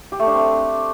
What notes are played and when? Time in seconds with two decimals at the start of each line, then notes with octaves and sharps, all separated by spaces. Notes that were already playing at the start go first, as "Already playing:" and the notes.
0.12 G4
0.19 A3
0.27 D4
0.34 C4